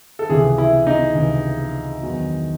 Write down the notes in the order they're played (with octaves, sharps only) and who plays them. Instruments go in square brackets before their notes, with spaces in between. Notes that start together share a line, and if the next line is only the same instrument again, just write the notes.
[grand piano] A4
C#2 C3 E3 G#4
E4
D#4
C#2 C3 E3
E2 D#3 F#3